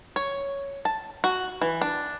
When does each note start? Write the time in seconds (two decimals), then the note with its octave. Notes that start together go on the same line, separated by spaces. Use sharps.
0.16 C#5
0.85 A5
1.24 F#4
1.61 E3
1.81 D4